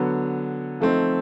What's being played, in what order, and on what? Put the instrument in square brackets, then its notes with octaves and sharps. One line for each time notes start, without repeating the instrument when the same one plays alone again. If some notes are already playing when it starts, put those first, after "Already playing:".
Already playing: [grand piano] D3 F#3 B3
F3 A3 C4 D#4